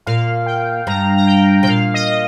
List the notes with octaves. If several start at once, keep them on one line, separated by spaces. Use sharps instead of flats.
A#2 F5
G5
G2 A#5
A#5
G5
C3 G5
A#2 F5
D#5